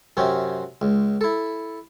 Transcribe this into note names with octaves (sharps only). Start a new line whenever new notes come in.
F#2 C3 C4 C#4
C#2
E4 A4